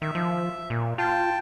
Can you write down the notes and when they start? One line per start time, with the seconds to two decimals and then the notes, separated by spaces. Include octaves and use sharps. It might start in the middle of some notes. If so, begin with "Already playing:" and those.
0.02 D#3 E5
0.15 F3
0.70 A#2
0.98 F4 G5 A5